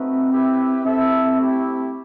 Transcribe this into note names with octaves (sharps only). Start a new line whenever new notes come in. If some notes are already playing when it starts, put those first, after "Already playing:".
Already playing: A3 C4 D#4 F#4 B4 E5
E4 G4 B4 E5 G5
C4 E4 A4 E5
A3 E4 G4